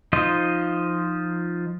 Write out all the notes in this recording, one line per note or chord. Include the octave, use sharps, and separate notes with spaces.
F3 D#4 F4 C5 D#5